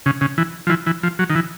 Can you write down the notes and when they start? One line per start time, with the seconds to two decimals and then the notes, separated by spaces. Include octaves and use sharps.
0.06 C#3
0.21 C#3
0.38 E3
0.67 F3
0.70 E3
0.86 E3
1.03 F3
1.19 F#3
1.30 D#3
1.35 E3